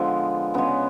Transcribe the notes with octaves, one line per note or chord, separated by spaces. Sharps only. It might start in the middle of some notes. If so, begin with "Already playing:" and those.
Already playing: D3 F3 G#3 B3
C#3 G#3 B3